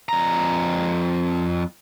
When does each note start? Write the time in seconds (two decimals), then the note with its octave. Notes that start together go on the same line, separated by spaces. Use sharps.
0.09 F2 A#5